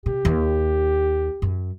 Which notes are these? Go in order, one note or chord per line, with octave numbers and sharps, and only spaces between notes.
C3 G4
D#2
F#2